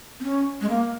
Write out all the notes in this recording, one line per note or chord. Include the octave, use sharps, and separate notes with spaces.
C4
C#4
G#3
A#3